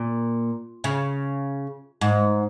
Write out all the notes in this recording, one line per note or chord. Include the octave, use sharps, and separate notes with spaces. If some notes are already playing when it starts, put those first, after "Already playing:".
Already playing: A#2
C#3
G#2